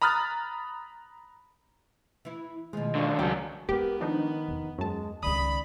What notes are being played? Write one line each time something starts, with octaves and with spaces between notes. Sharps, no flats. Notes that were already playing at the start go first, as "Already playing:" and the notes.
A#5 B5 D#6 F6 F#6 A6
E3 E4
B2 D#3 F3 G#3 A3 D#5
C2 D3 D5 F5 C#6
C#2 F#3 C4 G4 A4
G#3 B3 E4 G4 A#4
D#3 F3 D4 D#4
E2
F#2 G#3 A5
C#2 D#3 D5 B5 D#6